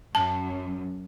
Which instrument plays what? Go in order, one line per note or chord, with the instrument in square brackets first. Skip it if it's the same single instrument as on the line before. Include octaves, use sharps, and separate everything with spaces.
[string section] F#2 [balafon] A5